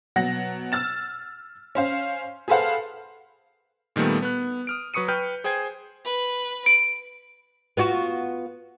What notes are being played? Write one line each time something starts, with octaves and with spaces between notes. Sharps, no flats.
B2 F#3 F#5 A#6
E6 F6 A6 E7
C#4 C5 F5
G#4 A4 B4 C5 F5 F#5
A#2 D#3 G3 A3 B3
B3 F#6
D#6 F6 D7
F#3 B4 C#6 D#6 C#7 D#7
B4 G5 F6 G6
G#4 C5 G5 G#5 G#6
B4
D7
B3 F4 F#4